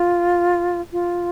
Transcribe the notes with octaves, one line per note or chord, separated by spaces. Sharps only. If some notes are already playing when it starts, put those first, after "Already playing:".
Already playing: F4
F4